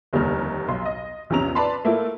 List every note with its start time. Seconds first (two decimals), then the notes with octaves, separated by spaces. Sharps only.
0.13 F1 D#2 D3 G3 F6
0.68 B1 C6
0.85 D#5
1.30 A#1 E2 C3 C#4 A#5 F7
1.55 B4 D5 A5 B5 C6
1.85 A3 A#3 E4 F4 A4